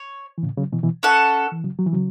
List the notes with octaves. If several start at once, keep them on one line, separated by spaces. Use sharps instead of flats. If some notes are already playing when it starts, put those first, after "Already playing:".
Already playing: C#5
E3
A2 C#3
C#3 F#3
B2 E3
B2 E3
C#4 A4 F#5
E3
C#3 F#3
F#3
E3
C#3 F#3